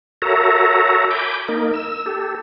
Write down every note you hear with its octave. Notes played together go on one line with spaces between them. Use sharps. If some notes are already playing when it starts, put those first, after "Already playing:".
F#4 A4 A#4 C#5 E5 A#5
G#5 B5 D6 G6
A#3 D#4 A#4
E6
G4 A4